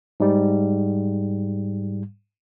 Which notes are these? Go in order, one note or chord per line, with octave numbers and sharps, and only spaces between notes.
G#2 G3